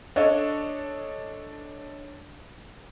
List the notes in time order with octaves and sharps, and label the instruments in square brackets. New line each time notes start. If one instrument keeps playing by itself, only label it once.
[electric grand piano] D4 A4 [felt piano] C#5 D#5